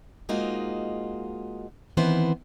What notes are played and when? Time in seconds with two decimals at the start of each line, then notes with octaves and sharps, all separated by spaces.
0.29 G#3 A#3 D#4 F4 F#4 C5
1.97 D#3 E3 B3 C4 C5